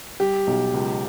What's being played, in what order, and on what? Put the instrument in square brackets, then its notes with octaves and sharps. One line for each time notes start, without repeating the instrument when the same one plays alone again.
[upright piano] G3 [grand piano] G4
[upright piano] B1
C#2